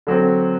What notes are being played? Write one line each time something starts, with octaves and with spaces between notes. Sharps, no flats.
D3 F#3 C4